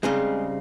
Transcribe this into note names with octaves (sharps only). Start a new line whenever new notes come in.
C#3 G3 G#3 C4 D#4 G#4